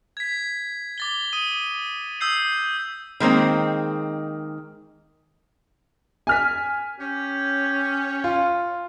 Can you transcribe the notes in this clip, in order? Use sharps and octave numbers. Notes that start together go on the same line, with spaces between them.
G#6 B6
D6 A6 G7
D#6 D#7
D#6 E6 G6 C7
D#3 G#3 A#3 C4
G#5 F6 B6
C#4 G4
F4